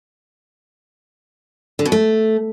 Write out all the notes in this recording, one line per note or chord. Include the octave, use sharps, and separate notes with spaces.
D3
B2
A3